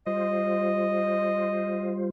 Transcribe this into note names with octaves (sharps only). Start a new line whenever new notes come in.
G3 F4 C5 D#5